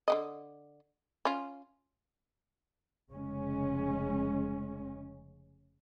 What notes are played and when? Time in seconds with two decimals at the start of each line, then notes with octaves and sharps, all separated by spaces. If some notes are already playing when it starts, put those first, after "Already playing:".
0.08 D3 B3 D#5
1.25 C#4 F4
3.10 F1 C#3 G#3 C#4